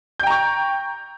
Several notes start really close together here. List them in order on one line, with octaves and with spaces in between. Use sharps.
G6 G5 A#5 C#6